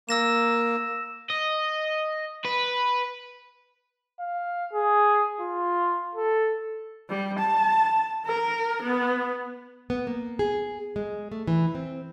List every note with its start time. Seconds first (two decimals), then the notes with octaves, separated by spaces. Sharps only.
0.09 A#3 E6 A#6 E7
1.30 D#5
2.45 B4
4.20 F5
4.73 G#4
5.41 F4
6.15 A4
7.09 G3
7.39 A5
8.26 A#4
8.82 B3
9.90 B3
10.07 A#3
10.39 G#4
10.96 G#3
11.32 A3
11.47 E3
11.75 C4